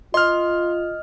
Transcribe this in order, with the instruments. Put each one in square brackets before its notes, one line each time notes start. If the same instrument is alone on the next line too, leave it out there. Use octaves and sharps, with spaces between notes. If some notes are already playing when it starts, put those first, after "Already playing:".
[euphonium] F4 [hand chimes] D#5 [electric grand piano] C6 F6